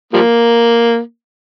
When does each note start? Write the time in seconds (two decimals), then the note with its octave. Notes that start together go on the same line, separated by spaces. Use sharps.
0.13 F3 G3 A#3